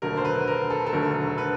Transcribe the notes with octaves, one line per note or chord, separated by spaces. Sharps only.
E1 D#2 D3 F#3 A3 A#4
C5
B4
A#4
A4
A4
E1 D#2 D3 F#3 A3 A#4
B4